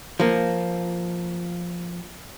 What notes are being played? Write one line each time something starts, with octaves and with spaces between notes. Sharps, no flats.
F3 A#3